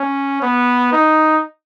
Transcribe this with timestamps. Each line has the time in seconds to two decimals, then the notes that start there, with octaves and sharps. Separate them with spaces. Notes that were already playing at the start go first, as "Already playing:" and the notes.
Already playing: C#4
0.42 B3
0.92 D#4